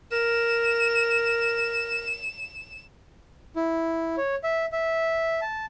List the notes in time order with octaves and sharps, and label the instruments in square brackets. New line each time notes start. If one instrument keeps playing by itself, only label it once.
[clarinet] A#4 [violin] E7
[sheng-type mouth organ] E4
C#5
E5
E5
A5